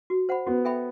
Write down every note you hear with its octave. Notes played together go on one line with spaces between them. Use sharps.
F#4
C5 F#5 B5
B3 F#4
A4 E5 G5 B5